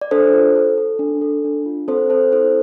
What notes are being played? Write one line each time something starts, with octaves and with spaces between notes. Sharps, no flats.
D5
D4 A4 C5
F4
A4
A4
D4
A4
D4
F4
C4 A4 C5
C4 A4 C5
E4 A4 C5